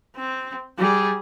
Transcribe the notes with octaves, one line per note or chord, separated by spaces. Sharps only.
C4
G3 G#4